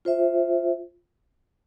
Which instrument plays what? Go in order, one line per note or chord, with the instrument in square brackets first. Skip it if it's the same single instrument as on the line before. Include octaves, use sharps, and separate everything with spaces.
[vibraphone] F4 C5 E5